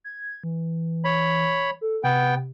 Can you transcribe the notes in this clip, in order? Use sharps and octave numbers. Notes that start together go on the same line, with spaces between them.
G#6
E3
C#5 B5
A4
C3 B3 G5